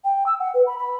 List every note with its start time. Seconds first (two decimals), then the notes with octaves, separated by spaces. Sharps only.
0.04 G5
0.26 E6
0.39 F#5
0.54 B4
0.66 B5
0.78 B5